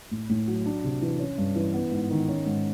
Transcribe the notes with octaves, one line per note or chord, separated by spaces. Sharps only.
A2
A2
F#3
D4
C3
E3
C#4
G2
E3
B3
G#2
D#3
C#4
G#2